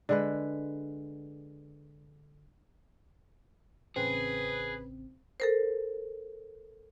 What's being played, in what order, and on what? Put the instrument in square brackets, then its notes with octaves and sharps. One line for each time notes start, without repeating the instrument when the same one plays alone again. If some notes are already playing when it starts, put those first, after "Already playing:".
[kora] D3 G#3 B4
[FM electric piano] A1 C#3 C4 [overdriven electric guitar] G#4 [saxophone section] B4
[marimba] A4 A#4 C5